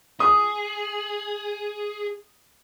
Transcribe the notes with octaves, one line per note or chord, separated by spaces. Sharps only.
G#4 D#6